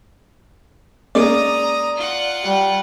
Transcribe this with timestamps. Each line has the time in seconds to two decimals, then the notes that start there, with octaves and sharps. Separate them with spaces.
1.15 G#3 A#3 C#4 D5 A#5 D#6
1.97 F4 F#5
2.44 G3